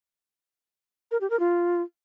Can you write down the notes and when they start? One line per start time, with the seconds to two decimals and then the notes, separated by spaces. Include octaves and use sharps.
1.11 A#4
1.21 G4
1.30 A#4
1.39 F4